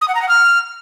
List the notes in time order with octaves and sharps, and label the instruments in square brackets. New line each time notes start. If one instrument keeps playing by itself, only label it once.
[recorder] D#6
F#5
A#5
F#5
F6